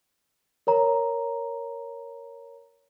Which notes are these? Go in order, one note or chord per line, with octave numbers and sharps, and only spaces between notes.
A#4 C#5 A#5